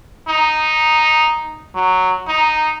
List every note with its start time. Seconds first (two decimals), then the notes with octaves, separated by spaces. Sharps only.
0.27 D#4
1.75 F#3
2.27 D#4